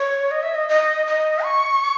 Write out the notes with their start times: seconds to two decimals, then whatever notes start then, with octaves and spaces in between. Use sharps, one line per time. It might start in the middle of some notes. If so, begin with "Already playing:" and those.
Already playing: C#5
0.31 D#5
0.43 E5
0.54 D#5
0.69 D#5
1.06 D#5
1.44 C#6